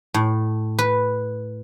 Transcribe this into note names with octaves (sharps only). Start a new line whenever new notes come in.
A2
B4